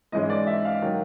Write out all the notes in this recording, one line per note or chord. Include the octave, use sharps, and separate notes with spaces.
G#2 E3 G#3 C#4 D#5
D5
E5
F5
D#3 F#3